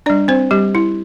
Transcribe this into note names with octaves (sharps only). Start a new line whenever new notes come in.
D4 D5
G3
C4 C5
G3 G4
E4